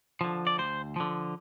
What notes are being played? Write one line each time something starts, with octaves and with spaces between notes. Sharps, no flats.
D3 F3
D5
D2 C5
D3 F3